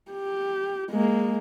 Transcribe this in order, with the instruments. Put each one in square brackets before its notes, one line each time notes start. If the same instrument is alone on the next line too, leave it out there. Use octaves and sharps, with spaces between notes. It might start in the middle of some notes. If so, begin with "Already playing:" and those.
[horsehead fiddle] G4
G#3 A#3